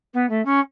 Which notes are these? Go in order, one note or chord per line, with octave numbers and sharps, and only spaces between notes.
B3
A3
C#4